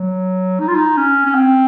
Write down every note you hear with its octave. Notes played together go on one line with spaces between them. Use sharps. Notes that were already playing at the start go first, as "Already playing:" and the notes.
Already playing: F#3
D#4
F4
D#4
C#4
C#4
C4